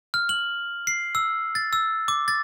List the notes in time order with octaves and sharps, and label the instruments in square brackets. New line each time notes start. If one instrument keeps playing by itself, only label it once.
[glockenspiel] F6
F#7
C7
E6
A6
E6
D6
A6